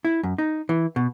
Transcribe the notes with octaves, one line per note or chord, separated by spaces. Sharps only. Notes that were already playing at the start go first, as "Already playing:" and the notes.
E4
F#2
D#4
E3
B2